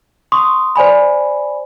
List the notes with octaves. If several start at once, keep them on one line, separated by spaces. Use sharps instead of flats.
C6 C#6 D#6
C5 D5 G#5 B5